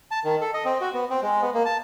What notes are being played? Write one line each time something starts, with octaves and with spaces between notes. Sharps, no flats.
A5
D#3
A4
D#5
C4
F#4
B3
C4
G#3
B3
A#3
A5